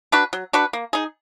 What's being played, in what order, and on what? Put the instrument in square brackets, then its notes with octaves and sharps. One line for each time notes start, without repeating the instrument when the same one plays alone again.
[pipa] D4 F#4 B4
F#3
D4 F#4 B4
A#3
D#4 G#4